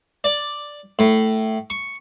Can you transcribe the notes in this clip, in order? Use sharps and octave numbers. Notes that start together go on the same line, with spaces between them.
D5
A2
C#6